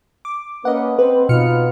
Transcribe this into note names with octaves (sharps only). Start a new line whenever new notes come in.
D6
A#3 C#4 B4 D#5 F#5
C4 B4
B2 B3 D#4 F4 F6 C#7